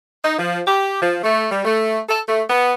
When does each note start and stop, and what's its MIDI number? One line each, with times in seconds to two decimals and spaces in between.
0.24 0.34 63
0.38 0.60 53
0.66 0.98 67
1.01 1.20 53
1.23 1.45 57
1.50 1.61 55
1.65 1.99 57
2.08 2.20 69
2.27 2.42 57
2.49 2.73 59